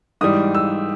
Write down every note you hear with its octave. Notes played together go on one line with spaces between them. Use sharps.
G#2 E3 G3 D#6
E6